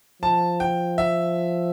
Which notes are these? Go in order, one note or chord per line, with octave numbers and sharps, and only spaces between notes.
F3 A5
G5
E5